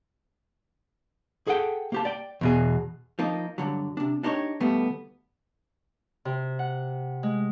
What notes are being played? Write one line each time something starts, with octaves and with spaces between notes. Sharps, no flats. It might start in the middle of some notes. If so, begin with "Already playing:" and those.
G#4 A4 F#5 G5
A#3 G4 A5
D5 G5
E2 B2 G#4
F3 A#3 D#4
G2 D3 F#3
C3 D4
D4 D#4 G4 C5 C#5
D#2 B2 G3 A3 B3
C3
F#5
G#3